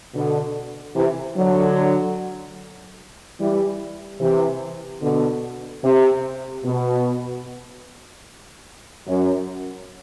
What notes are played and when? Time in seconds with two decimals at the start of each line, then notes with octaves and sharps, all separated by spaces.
0.14 B2 D3
0.95 C3 E3
1.35 D3 F#3
3.39 E3 G3
4.20 C3 E3
5.01 B2 D3
5.84 C3
6.65 B2
9.07 F#2